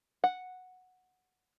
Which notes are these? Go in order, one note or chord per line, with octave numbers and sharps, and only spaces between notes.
F#5